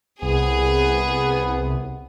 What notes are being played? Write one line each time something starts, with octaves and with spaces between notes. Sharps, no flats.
C2 B3 G#4